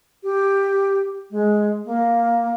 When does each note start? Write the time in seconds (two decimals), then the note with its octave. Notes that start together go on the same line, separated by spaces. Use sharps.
0.23 G4
1.30 G#3
1.85 A#3